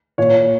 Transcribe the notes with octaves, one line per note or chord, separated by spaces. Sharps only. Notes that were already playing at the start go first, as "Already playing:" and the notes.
A#2 C#5